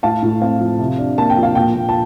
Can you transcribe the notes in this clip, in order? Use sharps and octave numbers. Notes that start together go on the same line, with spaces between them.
A2 F5 A5
A2
C4 F5
F3
C3
D4
A#3 A5
G5
F3
F5
A#2 G5
A#2
A5